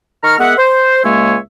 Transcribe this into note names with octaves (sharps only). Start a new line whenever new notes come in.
D#3 A#5 C#6 F6
G#3 B3 A#4 E5 F#5
C5
C#2 G#3 A#3 C#5 E5 G#5